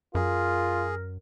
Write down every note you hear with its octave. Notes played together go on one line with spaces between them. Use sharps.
F#2 F4 G#4 A#4